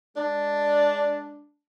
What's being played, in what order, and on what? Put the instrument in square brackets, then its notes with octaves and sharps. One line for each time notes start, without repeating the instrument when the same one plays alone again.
[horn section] G#3 D4